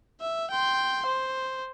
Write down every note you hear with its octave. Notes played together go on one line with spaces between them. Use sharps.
E5
G5 C6
C5